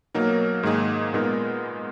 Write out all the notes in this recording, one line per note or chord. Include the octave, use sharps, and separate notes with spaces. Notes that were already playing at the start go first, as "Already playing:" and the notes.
B2 F#3 A#3 D#4 A#4
G#2 D#3 A#3 D#4 G#4
A#2 G#3 B3 D#4 A#4